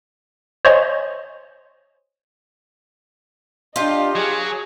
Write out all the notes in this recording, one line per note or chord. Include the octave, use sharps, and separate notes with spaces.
C5 C#5 D#5 G#5
D4 F4 G4 D#5
F#3 G#4